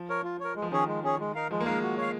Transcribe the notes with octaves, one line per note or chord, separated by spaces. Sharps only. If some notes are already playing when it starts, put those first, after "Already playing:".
Already playing: F3
A#4 C#5
F4
A#4 C#5
G#3
F3
D#3 C#4 G#4 C#5
G#3
C#4 G#4 C#5
G#3
D#4 A#4 F5
F3 G#3
A#3
G#3 D#4 A#4 F5
F#4
C#5 F5